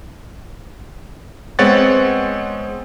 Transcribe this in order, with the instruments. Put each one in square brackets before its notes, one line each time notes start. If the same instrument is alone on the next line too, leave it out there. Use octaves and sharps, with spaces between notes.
[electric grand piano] G#3 B3 C4 C#5 F#5 A6